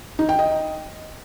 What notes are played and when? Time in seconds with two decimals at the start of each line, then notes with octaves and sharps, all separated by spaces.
0.19 D#4
0.29 G5
0.39 D#5